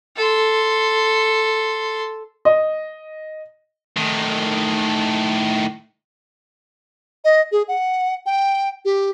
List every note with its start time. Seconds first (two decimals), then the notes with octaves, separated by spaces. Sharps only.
0.16 A4 C6
2.45 D#5
3.97 A2 D#3
7.24 D#5
7.52 G#4
7.68 F#5
8.26 G5
8.85 G4